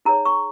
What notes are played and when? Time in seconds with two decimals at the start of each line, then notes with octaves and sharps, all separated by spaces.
0.05 D#4 G#4 C#5 A#5
0.25 C#6